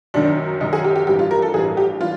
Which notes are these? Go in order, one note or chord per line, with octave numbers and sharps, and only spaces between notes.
F#2 D#3 F#3 D4
F#2 D#3 F#3 D#4
G#4
G4
G4
A1 G2 E3 G3 G4
F4
A#4
A4
A1 G2 E3 G3 G#4
G4
E3 G3 F4